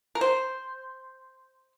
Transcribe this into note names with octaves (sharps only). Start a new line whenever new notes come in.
A#4
C5